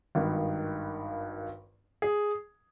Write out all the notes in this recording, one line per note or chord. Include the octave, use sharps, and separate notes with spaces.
G#1 G2 D#3
G#4